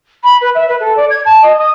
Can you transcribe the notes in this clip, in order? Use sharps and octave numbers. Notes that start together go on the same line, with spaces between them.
B5
B4
E5
B4
A4
D5
G#6
A5
D#5
D#6